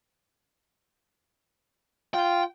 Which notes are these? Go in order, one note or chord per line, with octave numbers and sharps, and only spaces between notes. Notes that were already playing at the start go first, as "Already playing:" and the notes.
F4 G5